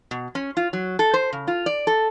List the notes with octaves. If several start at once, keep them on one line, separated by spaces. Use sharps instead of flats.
B2
C#4
F4
F#3
A4
C5
C#3
F4
D5
A4